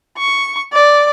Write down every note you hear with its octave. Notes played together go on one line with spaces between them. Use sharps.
C#6
D5